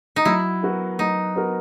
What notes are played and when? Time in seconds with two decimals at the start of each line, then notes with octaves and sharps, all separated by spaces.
0.16 D#4
0.25 F#3 E4
0.63 B3 F#4 A#4
0.99 F#3 D#4
1.35 B3 F#4 A#4